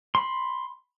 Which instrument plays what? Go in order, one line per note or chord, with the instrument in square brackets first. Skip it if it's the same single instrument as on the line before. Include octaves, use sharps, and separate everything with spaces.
[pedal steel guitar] B5 C6